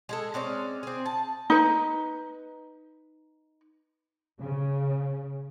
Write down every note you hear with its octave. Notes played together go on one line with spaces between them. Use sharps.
G#3 G#4 A4
G#3 C4 C#4 D5
C4 G#4
A5
D#4 B4
C#3